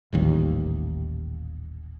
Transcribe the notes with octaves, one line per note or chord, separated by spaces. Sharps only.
D#1 A1 D#2